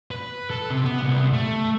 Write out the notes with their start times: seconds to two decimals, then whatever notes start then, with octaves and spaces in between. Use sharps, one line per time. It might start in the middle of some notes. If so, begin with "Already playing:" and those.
0.11 B4
0.50 A4
0.70 C3
0.85 B3
1.02 C2
1.33 A3